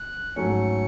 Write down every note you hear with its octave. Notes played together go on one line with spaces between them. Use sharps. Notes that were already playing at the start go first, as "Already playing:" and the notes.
Already playing: F#6
G#2 F#3 A3 C#4 C#7